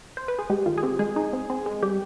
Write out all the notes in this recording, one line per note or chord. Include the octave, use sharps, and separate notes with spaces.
C5
B4
G#4
G#3 G4
D#3 F4
G#4
C4 G4
G#3 G#4
D#4
C4
C4
G#3
G3 G4